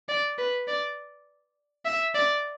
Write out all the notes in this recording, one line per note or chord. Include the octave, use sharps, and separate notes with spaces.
D5
B4
D5
E5
D5